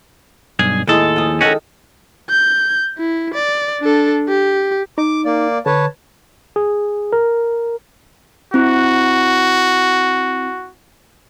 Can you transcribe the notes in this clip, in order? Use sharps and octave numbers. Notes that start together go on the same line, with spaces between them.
B1 G2 G#4
D#2 A2 G#3 G#4 A4
F3 G#4
D#3 C#4 F#4 A4
G6
E4
D5
D4 A4
G4
D#4 D6
A#3 D5
D3 B4 C#5 A5
G#4
A#4
C4 E4 F#4